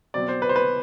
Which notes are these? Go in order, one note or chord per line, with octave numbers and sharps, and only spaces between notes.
B2 F#3 C4 D5
C5
B4
C5
B4